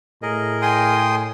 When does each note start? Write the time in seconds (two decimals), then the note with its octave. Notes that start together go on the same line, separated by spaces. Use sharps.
0.23 A2 G#4 A#4 D#5
0.62 G5 G#5 C6 D#6